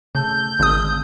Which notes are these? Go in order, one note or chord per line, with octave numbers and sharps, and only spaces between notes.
C#3 A3 A5 E6 G6
G#1 D3 G#3 D#6